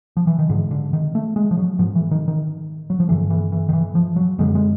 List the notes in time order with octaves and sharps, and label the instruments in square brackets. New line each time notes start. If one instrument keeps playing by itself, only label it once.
[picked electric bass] F3
E3
D#3
G#2 D3
D3
D#3
A3
G#3
F3
F#3
G#2 F3
E3
D#3
D#3
F#3
F3
G2 D3 E3
E3
E3
D#3
E3
F3
F#3
F#2 D3 G#3
G#3